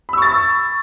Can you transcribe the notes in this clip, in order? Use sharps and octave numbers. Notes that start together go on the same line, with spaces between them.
B5 C#6 E6 A6